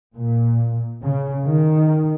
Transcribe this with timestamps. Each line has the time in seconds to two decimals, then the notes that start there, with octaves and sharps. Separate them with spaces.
0.14 A#2
1.02 C#3
1.46 D#3